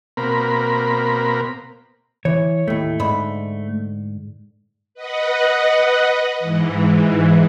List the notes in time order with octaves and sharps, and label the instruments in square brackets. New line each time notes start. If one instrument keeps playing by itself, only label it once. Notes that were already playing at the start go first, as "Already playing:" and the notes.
[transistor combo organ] B2 A#3 C4 A#4 B5
[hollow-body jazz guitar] E3 [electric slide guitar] C#5
[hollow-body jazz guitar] D#2 A2 [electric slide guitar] A3
[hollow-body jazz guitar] G#2 D3 B5
[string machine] B4 D#5 F#5
G#2 E3